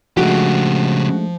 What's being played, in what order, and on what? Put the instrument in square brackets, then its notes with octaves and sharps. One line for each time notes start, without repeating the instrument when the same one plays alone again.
[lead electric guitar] C#3 G4 [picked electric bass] F3 [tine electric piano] G#3 A3 D4 [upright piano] F#4